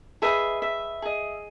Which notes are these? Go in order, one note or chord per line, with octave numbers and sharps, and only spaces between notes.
G#4 B4 D#5 E5
E5
G#4 D#5